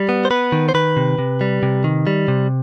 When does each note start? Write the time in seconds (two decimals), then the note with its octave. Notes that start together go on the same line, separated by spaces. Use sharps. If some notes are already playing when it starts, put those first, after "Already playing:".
Already playing: G3
0.09 B3
0.25 C5
0.31 B3 B4
0.52 D#3
0.69 C5
0.74 D#3 B4
0.97 C3
1.19 C3
1.41 G3
1.63 C3
1.84 D#3
2.07 G3
2.28 C3